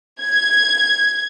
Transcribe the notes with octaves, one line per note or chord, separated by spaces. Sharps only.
G#6